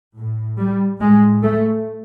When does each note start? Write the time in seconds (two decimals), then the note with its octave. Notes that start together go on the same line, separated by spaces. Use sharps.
0.17 A2
0.59 G3
1.01 A2 G#3
1.43 A3